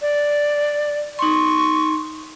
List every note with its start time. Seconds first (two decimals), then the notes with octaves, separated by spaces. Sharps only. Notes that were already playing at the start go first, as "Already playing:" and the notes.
0.02 D5
1.19 D#4 C6 C#6